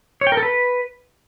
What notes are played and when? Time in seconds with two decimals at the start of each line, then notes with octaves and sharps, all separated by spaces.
0.21 C#5
0.27 G5
0.32 A#4
0.37 A4
0.43 B4